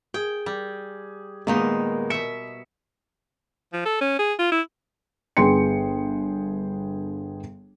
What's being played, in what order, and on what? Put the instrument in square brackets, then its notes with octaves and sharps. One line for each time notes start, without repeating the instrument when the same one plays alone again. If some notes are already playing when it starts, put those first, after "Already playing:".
[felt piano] G#4 [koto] G5
[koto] G3
[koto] A#2 D#3 D#4 [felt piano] G#3 A#3 B3
[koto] B2 E5 [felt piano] C#7
[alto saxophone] F3
A4
C#4
G#4
F4
E4
[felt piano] G1 B3 G#4 G5 C6 C#7